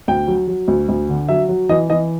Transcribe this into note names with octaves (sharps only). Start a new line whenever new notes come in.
D2 G5
F#3
F#3
D2
D2
D3
F#3 E5
F#3
E3 D#5
E3 D#5